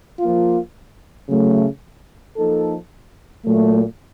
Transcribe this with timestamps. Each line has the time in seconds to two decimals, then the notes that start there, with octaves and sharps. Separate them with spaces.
0.19 F3 A#3 F4
1.27 C#3 F#3 A3
2.36 F3 A#3 D#4 A4
3.44 A#2 F#3 A3